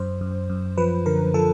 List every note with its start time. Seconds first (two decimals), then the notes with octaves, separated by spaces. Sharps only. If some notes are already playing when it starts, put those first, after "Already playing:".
Already playing: F#2 C5
0.21 F#2
0.50 F#2
0.78 F3 B4
1.06 D3 A#4
1.34 F3 A4